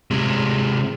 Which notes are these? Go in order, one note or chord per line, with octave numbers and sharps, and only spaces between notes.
C3 G#3